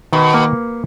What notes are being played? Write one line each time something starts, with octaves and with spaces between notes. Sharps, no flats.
B2 D#3
A#3